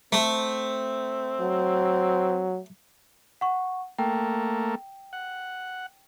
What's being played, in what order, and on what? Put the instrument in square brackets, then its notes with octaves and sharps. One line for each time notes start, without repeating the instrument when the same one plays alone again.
[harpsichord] A3 [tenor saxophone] C4
[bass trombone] F#3
[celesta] F#5 C#6
[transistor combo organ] A3 A#3 [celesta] G5
[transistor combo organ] F#5